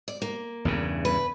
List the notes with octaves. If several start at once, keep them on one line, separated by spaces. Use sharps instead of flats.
D5
A#3
E2 G2 C#3
B4